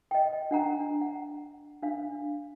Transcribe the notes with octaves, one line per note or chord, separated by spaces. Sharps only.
D#5 G5
D4 F#5 A#5
F#5
D4 F5